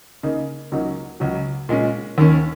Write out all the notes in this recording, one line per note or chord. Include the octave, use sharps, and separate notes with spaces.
C#3 A#3 D#4
C#2 C#3 F#3 A#3 D#4
C#2 C#3 F#3
A#2 G#3 C#4
D#2 D#3 A#3 C#4